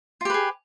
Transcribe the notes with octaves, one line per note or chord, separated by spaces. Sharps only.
F4 G4 G#4 B4